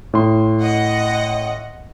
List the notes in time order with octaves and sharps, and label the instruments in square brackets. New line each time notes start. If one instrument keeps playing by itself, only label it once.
[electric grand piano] A2 C6
[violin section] D#5 F#5